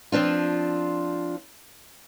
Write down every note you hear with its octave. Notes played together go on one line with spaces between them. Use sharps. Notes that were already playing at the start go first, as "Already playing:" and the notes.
F3 C4 D4 F4